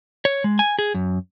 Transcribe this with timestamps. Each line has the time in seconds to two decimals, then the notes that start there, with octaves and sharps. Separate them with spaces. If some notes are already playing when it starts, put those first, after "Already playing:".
0.25 C#5
0.44 G#3
0.59 G#5
0.79 G#4
0.94 F#2